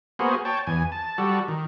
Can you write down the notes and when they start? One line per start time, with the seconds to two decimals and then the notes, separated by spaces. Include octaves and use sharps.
0.19 A#3 B3 F#4 G#4 C5
0.45 C#5 G5 A5
0.67 E2 G#5
0.92 A5
1.18 G3 F#4 A4
1.48 D#3